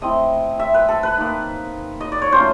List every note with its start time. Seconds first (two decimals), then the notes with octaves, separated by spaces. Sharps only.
0.01 A3 C4 E4 D#5
0.59 E5
0.74 B4
0.89 A4
1.03 B4
1.17 A#3 D#4
2.00 D#5
2.12 D5
2.22 C#5
2.32 F#3 A3 C#4 F4 C5